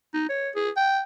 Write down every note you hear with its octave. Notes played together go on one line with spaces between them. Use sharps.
D#4
C#5
G#4
G5